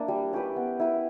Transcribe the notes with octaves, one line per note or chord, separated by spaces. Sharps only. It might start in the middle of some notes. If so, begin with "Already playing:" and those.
Already playing: A#3 D4 E4
G3
C#4 G4 B4
B3
E4 B4